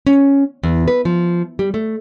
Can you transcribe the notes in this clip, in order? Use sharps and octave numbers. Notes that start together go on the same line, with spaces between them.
C#4
E2
B4
F3
G3
A3